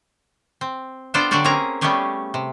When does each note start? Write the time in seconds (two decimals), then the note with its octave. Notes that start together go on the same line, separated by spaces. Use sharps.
0.61 C4
1.14 B3 D4 F4 A4 C5 G5
1.31 D3 F#3 D4 F#4 G4 D5
1.44 A#3 C4 C#4 G#4 A#5
1.81 G3 A3 B3 C#4 G4 G#4
2.34 C3